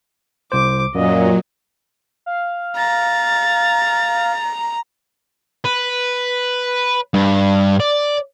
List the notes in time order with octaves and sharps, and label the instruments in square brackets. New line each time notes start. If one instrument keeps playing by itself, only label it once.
[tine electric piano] C2 C5 [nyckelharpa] D6
[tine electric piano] F#2 [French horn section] A#2 [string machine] F#3 [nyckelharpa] D#5
[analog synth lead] F5
[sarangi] A#5 [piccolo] A6
[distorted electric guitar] B4
G2
D5